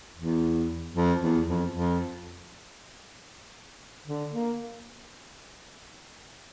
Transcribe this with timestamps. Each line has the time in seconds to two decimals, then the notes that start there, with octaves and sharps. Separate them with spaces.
0.17 E2
0.95 F2
1.21 E2
1.47 F2
1.72 F2
4.06 D3
4.33 A#3